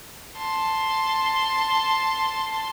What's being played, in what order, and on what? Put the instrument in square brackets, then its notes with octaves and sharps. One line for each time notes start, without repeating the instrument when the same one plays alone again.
[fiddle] A5 C6